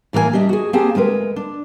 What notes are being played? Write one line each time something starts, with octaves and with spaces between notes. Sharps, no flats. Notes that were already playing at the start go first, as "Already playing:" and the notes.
A2 E3 A#3 D5 G#5
G3 D4 D#5 E5
F#4 G#4
A#3 C4 G4 G#4 G5 A5
D2 G#3 A#4 B4
D4